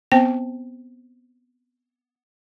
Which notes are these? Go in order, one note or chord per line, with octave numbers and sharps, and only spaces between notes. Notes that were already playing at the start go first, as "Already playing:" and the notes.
B3 C4 C5 G5